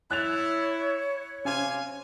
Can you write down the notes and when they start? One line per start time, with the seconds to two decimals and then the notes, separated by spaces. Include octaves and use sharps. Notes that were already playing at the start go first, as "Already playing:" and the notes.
0.11 E4 C#5 F#6 A6 F7
1.45 C3 C#4 F5 G#5